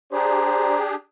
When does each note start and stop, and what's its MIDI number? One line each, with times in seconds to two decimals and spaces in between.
0.13 0.95 62
0.13 0.95 67
0.13 0.95 68
0.13 0.78 72
0.13 0.78 74
0.13 0.78 82